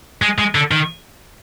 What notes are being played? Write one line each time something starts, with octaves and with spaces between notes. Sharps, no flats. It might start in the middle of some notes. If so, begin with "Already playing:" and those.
G#3
G#3
D3
D#3